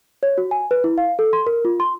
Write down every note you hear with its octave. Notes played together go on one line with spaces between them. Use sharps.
C#5
F#4
G#5
B4
E4
F5
A4
C6
A#4
F4
C6